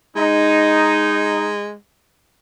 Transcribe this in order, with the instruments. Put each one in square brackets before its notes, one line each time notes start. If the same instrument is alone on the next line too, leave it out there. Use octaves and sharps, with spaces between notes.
[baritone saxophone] G#3 [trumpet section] D#4